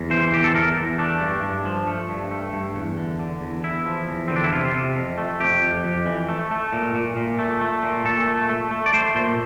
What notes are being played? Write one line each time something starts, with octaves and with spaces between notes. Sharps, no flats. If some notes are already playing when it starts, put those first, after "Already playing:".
Already playing: E2
E3 C5
E2 G4
A4
E2 A#4
E2
A3 D4
G2
G2
F3
A3
G2
A3
G2
E2
D3
D3
E2
E2 E4
F3
E2
D3 C4
D4
E4
C3 F4
C3
F2
A3
F2 G4
F2
F2
E3
A3
A3
A#2
A#2
A#2
A3
A3
A#2
A#2 A4
A3
A3
A3
D5
A3 C5
A#2 C5